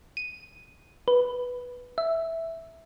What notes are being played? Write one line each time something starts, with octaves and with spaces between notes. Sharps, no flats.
D#7
B4
E5